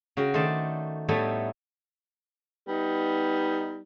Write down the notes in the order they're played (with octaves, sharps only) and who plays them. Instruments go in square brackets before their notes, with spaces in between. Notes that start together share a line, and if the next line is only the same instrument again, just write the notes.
[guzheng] C#3 F#4 A#4 G5
D#3 A3 D#4 C5 D5 A5
A2 G3 A3 B3 D#4 E4
[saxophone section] G3 B3 D#4